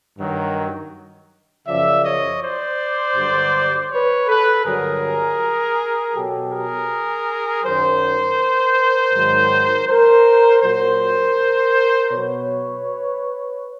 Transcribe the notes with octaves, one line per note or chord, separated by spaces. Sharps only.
G2 D#3 F#3
F#2 C#3 F3 D5 E5
C#5 D#5
C5 D5
G2 D3 F#3
B4 C#5
A4 B4
G2 D3 F#3 G#4 A#4
B2 F#3 G4 A4
G#4 A#4
F#2 D#3 F#3 A#4 C5
G#2 D#3 F#3
A#4 C5
A#2 F#3 A#4 C5
B2 F#3 B4 C#5